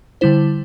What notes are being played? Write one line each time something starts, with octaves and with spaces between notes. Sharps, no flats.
D3 G3 E4 C5